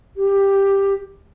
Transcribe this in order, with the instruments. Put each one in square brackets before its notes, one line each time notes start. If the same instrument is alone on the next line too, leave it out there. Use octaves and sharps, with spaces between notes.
[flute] G4